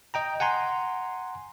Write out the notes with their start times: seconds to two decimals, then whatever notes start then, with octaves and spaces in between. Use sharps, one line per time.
0.14 D#5 G5 A#5
0.40 F#5 G#5 A#5 C6